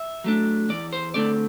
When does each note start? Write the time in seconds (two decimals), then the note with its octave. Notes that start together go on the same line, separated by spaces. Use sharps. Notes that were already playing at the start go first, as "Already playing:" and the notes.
Already playing: E5
0.24 F#3 A3 D4
0.69 E2 D5
0.93 C5
1.14 D3 A3 C4 D5